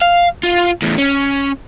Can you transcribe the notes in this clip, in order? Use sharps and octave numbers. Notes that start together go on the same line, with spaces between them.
F5
F4
E2 A2
C#4